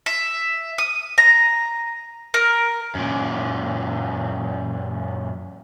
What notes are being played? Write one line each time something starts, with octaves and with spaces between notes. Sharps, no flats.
E5
D#6
A#5
A#4
F#2 A#2